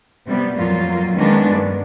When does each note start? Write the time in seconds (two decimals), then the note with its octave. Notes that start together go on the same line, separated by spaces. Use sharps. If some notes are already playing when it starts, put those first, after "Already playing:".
0.25 C3 G3 B3
0.56 F2 A#2 F#3 A#3 F4
1.15 D#3 G#3 A#3 B3 C#4 D4
1.48 G2